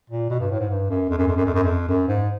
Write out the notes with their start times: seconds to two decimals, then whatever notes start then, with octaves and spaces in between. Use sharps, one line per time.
0.10 A#2
0.30 B2
0.40 G2
0.51 A2
0.60 G#2
0.70 G2
0.90 F#2
1.10 F2
1.18 F#2
1.28 F2
1.36 F#2
1.45 F2
1.55 F#2
1.64 F2
1.89 F#2
2.08 G#2